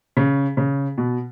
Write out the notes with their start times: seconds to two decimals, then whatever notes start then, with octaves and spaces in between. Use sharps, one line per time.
0.17 C#3
0.57 C#3
0.98 B2